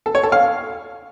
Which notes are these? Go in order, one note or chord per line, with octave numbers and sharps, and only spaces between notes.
A4
C#5
A4
F5